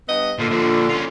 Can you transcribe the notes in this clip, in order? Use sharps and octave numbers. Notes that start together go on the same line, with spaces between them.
G2 B3 D#5
A#2 D3
A#2 F3
C#4 F4